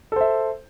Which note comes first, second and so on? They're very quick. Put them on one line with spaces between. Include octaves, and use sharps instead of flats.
A4 C5 E5